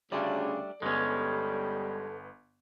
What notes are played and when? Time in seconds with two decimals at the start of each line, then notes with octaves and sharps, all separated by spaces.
0.12 D2 C#3 G3 A3 D4 D5
0.82 G1 G3 G#3 B3 C#4 A4